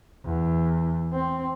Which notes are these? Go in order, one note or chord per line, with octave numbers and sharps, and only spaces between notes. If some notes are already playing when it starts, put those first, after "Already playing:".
E2
C4